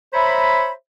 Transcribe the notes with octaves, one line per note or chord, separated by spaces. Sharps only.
C5 C#5 E5 A#5 B5